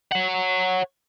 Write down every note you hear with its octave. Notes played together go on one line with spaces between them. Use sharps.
C#5 F#5